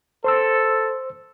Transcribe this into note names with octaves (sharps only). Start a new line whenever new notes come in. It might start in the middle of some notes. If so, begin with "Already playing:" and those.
A4 C5 C6 E6